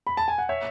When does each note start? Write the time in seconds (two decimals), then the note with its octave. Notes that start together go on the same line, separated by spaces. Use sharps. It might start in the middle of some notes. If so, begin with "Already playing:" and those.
0.07 B5
0.17 A5
0.28 G#5
0.38 F#5
0.49 C#5 E5